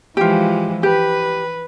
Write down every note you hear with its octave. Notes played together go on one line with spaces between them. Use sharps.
E3 F3 G#3 F4 G4
G4 B4